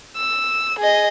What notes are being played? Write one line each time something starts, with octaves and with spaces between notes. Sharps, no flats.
E6
G#4 D#5